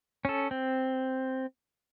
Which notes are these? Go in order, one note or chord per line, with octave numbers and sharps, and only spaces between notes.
C#4 A4
C4